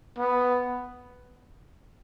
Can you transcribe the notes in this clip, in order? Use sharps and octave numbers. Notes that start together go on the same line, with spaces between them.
B3